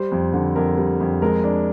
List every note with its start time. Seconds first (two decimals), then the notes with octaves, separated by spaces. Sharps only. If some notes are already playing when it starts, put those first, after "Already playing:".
Already playing: G3 C5
0.12 F2
0.33 D3
0.56 F2 A#4
0.77 G3
1.00 F2
1.22 G#3 A#4
1.44 D4